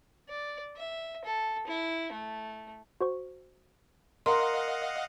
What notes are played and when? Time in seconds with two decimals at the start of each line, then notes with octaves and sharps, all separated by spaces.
0.29 D5
0.77 E5
1.25 A4
1.67 E4
2.12 A3
3.01 F#4 C5 C#6
4.26 A#4 D#5 F5 F#5 C6